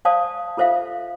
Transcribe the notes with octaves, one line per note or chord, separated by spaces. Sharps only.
C5 D5 F5 A5 D#6
F4 A4 C5 E5 F5